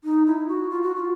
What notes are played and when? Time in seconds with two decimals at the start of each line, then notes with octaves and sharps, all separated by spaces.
0.04 D#4
0.26 E4
0.48 F#4
0.70 F4
0.82 F#4
0.96 F4